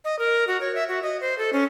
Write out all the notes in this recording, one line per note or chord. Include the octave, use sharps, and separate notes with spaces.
D#5
A#4
F#4
C#5
E5
F#4
D#5
C5
A4
C#4